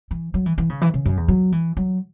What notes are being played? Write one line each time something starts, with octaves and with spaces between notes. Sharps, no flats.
E3
F#3
E3
E3
C#3
E3
C#3
F#2
E2
F#3
E3
F#3